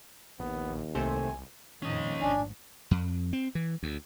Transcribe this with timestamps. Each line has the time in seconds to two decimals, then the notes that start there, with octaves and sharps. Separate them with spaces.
0.39 A#1 D#2 B3
0.95 C2 C3 A3 C5 G#5
1.82 F2 A#2 D#3 C#4 D#5
2.21 A1 G#2 D4 G#5
2.91 F2
3.33 C4
3.55 E3
3.83 D2